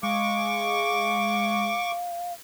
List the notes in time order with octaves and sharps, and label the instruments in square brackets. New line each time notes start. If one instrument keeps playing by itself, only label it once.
[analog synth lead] G#3 [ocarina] F5 [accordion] C#6 D6